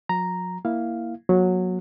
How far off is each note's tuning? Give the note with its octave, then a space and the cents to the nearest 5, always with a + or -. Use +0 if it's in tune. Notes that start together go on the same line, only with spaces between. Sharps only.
F#3 -45 A#5 +0
A#3 +0 E4 +0 F5 +0
F#3 -15 A#3 +40